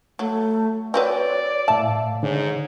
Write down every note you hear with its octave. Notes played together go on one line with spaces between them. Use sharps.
F#3 A3
C4 F#4 B4 C#5 D5
A2 E5 F5 A5
G#2 D3 C#5